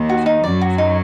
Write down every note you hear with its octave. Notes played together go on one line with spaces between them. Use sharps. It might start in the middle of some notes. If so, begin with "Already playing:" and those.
Already playing: D#2 D#3
F#4
D#4
F#2 F#3 D5
F#4
D#4